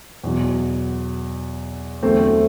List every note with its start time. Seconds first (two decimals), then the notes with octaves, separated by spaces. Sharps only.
0.24 E2 B2 F#3
2.02 E2 D3 F#3 A3 C4